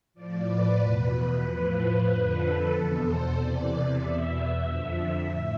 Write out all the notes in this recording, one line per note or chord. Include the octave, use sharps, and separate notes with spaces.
A2 F3 D5
B4
E2 B2
A2 F3
F2 D3 F3 B4
A4
E2 B2 A4
C5
E2 C3 E3 D5
E2 B2 E5
F2 D3 F3
A2